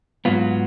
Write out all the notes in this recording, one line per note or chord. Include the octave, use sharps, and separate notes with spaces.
G#2 F#3 B3 F4